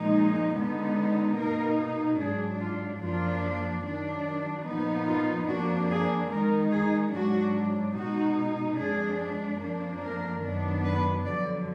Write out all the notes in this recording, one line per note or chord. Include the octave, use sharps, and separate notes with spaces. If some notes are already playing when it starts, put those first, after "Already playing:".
Already playing: A#2 F3 G#3 D#4
D3 G#3 B3 D#4
B2 A#3 D#4 A#4
G#2 F#3 D4 G#4
F4
F#2 F3 A#3 D4 F4
D#3 F#3 D4
A#2 F3 B3 D#4
F4
F2 F3 A#3 D4 F#4
G#4
D#3 G#3 D#4 A#4
G#4
G#2 F#3 D4 F#4
B2 G#3 D#4 F#4
F2 F3 G#3 D4 G#4
F2 F3 A#3 D4
A#4
F#2 D#3 F#3 B3 D4
B4
F2 D3 F#3 D5